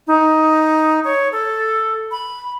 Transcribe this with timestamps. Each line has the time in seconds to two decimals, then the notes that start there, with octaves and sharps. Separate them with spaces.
0.07 D#4
1.04 C#5
1.32 A4
2.11 B5